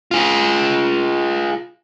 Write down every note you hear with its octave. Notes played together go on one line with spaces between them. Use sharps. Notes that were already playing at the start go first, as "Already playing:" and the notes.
F4 G#4